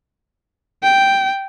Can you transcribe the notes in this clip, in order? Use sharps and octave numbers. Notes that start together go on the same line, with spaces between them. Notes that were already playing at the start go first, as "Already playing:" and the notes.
G5